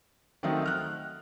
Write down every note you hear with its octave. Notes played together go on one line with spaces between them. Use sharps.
D#3 F#3 A3 C4 D#4
F6 F#6